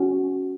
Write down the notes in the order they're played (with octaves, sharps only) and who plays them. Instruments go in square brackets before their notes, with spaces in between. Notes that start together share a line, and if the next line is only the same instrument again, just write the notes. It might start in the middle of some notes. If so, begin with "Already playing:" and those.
Already playing: [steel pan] C#4 F#4